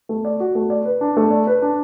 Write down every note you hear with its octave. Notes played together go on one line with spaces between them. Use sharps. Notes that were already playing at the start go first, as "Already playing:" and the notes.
A3
D5
F#4
A3
D5
B4
D4
A3
D5
B4
D4